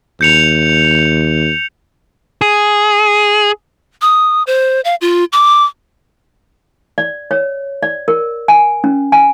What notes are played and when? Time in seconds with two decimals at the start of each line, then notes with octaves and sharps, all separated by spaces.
0.21 D#2 G6 C#7 F7
2.41 G#4
4.02 D#6
4.47 C5
4.85 F5
5.01 F4
5.32 D6
6.98 D5
7.31 C#5
7.83 D5
8.08 A#4
8.48 G#5
8.84 C#4
9.12 G#5